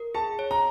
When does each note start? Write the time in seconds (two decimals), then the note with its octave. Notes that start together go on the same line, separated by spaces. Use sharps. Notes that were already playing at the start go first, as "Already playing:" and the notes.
Already playing: A#4
0.14 G#4 A5
0.39 C#5
0.51 A#5